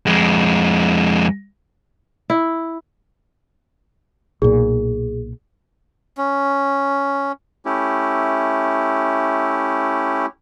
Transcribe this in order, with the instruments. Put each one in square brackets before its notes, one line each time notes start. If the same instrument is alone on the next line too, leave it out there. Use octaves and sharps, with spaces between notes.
[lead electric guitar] F2 G#3
[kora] E4
[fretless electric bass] B1 A#2 [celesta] G#4
[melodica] C#4
[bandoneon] A3 C#4 E4 G4